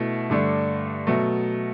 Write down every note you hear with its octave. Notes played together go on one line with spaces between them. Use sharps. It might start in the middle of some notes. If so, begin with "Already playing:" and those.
Already playing: B2 A3 E4
G2 D3 A3 D4
B2 F#3 A3